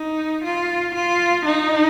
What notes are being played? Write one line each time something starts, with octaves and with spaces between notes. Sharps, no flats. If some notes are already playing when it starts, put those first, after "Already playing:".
Already playing: D#4
F4
F4
D#4